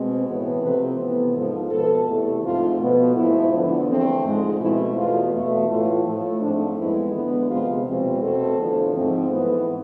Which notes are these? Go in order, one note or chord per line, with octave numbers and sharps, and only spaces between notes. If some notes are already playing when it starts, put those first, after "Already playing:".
Already playing: B2 G#3 C4
A2 E3 B3
C3 F3 A3 C4 B4
C3 E3 B3
G#2 F3 G#3 A4
B2 B3 A4
E2 C3 E3 A3
G#2 F3 A3 C4 F4
B2 B3
G#2 F3 A3 E4
E2 D3 F3 B3
E2 D3 A3 C4
G#2 F3 G#3
B2 A3 C4 E4
E2 B2 B3 F4
E2 B2 A3
A2 E3 A3 F4
A2 F3 A3
G#2 F3 A3 C4 D4
F2 E3 G#3 B3 E4
E2 D3 G#3 B3
C3 F3 G#3 B3 F4
E2 B2 G#3 C4
B2 A3 C4 A4
E2 D3 F3
G#2 F3 A3 C4
G#2 E3 B3